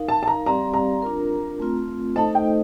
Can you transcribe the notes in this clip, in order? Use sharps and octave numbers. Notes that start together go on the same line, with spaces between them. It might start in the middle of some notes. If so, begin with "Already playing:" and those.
Already playing: D#4 A#4 F5
A5
A5
A#5
G3 C4 G4 D5 F5 A#5
A#5
D4 F4 A#4
A3 C4 F4
A3 D#4 A4 C5 D#5 A5
G5